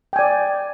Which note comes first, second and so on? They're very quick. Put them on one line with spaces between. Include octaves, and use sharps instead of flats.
G5 G#5 D5